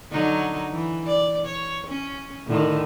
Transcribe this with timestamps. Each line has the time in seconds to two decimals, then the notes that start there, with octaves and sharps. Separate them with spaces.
0.11 D3 F#3 D#4
0.72 E3
1.07 D5
1.46 C#5
1.87 C#4
2.47 A2 D3 D#3